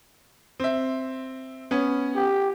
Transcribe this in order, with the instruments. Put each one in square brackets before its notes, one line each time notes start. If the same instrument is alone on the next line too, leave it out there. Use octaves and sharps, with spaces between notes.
[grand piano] C4 E5
B3 C#4
[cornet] G4